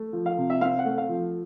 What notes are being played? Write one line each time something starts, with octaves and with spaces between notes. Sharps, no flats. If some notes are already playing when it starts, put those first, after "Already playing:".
Already playing: A3
F3
F5
C3
E5
C4 F5
F#5
A3
F5
F3